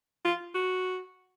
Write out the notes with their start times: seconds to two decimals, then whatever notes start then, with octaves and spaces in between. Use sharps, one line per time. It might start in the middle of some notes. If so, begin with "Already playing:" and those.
0.25 F4
0.54 F#4